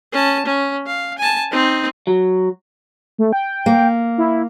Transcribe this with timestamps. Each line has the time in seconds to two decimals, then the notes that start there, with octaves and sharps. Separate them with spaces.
0.13 C#4 A5
0.46 C#4
0.87 F5
1.18 G#5 A5
1.52 C4 D#4
2.07 F#3
3.18 A3
3.33 G5
3.66 A#3
4.18 E4